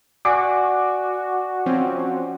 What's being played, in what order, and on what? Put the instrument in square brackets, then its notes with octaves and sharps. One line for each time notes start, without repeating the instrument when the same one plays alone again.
[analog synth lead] F#4 [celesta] D5 F#5 G#5 [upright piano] D6
[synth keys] F3 C4 C#4